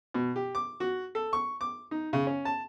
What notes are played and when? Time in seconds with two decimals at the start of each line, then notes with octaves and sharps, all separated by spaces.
0.14 B2
0.36 G4
0.55 D6
0.80 F#4
1.15 A4
1.33 C#6
1.61 D6
1.91 D#4
2.13 C#3
2.27 C#4
2.45 A5